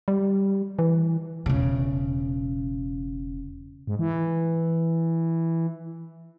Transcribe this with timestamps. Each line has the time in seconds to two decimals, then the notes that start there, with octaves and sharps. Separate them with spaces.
0.08 G3
0.79 E3
1.46 E1 C#3
3.87 G#2
3.99 E3